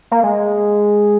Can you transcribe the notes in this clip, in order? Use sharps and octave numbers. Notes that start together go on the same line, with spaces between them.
A#3
G#3